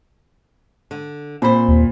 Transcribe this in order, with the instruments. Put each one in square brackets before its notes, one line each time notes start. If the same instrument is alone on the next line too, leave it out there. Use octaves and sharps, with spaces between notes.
[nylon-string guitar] D3
[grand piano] A#2 B5 [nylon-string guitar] C4 C5
[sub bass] D#2